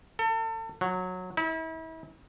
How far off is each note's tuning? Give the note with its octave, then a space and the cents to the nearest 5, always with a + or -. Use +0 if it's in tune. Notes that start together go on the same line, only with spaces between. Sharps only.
A4 +35
F#3 -15
E4 -40